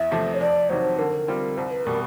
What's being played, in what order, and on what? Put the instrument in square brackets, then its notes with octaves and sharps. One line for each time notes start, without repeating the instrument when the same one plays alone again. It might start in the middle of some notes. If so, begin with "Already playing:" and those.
Already playing: [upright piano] E2 [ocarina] E5
[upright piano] C3 F3 A3
[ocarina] C#5
[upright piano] F2 [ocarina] D5
[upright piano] C3 D#3 F#3 [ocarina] C5
[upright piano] D3 [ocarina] A#4
[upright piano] G3 C4 F4
[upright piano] C2 [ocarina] C5
[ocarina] B4
[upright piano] B2 G3 [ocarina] A#4